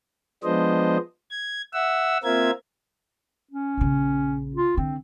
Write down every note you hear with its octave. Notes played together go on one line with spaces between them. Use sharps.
F3 G#3 B3 D4 C5 D#5
G#6
E5 F#5 E6
A#3 C4 F4 A#4 E5 G#6
C#4
A#1 C#3
F4
D3 C4